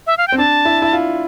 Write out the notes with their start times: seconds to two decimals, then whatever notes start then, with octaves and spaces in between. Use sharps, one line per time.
0.07 E5
0.18 F5
0.28 C4 G5
0.38 D4 A5
0.65 E4
0.82 E4
0.92 F4